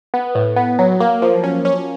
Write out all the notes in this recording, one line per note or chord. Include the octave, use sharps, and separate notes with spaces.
B3
A2
B3
F#3
A#3
F3
C#4
C#4